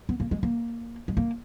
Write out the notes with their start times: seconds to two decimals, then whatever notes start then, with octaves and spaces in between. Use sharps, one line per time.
0.09 B3
0.20 A#3
0.31 G#3
0.43 A#3
1.08 G#3
1.17 A#3